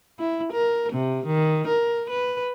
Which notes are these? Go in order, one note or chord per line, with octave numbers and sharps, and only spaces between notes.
E4
A#4
C3
D#3
A#4
B4